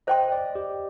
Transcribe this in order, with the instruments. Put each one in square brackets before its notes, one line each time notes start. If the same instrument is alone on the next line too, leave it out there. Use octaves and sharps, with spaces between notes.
[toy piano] C5 G5 C6 [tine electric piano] D#5
[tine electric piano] D5
G4